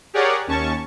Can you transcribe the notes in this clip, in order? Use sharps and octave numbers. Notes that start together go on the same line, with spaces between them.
G4 G#4 A#4 C#5 D5 F#5
D#2 C#4 A5 C#6